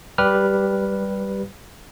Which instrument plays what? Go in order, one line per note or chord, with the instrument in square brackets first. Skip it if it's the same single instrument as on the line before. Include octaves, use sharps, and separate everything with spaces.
[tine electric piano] G3 G4 B4 F6